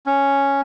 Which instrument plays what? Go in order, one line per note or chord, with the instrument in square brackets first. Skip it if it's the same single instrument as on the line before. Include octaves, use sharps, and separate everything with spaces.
[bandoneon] C#4